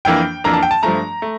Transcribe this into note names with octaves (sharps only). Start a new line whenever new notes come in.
F2 E3 A#3 D4 G5
F2 E3 A#3 D4 A#5
A5
G5
A5
G2 F3 A3 A#5
A3